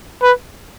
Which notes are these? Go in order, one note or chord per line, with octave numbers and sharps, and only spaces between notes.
B4